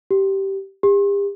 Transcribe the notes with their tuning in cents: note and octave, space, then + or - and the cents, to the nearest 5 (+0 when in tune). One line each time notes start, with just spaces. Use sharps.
G4 -15
G4 +40